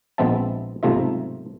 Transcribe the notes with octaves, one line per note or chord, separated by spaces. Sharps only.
A#1 G#3 B3 C4 E5 A5
B1 G#2 C3 A3 F4 E5